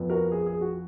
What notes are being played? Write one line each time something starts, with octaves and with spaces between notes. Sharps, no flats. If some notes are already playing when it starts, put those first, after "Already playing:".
Already playing: F2 F3 B3
F#4 A#4
G#4
G#4
F#4